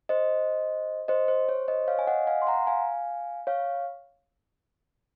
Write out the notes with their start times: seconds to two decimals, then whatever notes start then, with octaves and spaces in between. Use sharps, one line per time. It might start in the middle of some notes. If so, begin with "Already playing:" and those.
0.09 C5 D#5
1.08 C5 D#5
1.28 C5
1.49 C#5
1.68 C5 D#5
1.88 C#5 F5
1.99 G#5
2.07 D#5 F#5
2.27 F5 G#5
2.42 C6
2.47 F#5 A#5
2.67 F5 G#5
3.47 C#5 F5